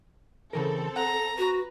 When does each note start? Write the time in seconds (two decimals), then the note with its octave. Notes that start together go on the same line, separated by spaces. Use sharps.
0.53 C#3 E3 C4 A4 A#4
0.96 F#5 A#5
1.38 F#4 B4